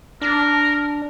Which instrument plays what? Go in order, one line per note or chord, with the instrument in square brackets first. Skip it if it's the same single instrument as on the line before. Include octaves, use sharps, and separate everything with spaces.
[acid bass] D4 [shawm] A#4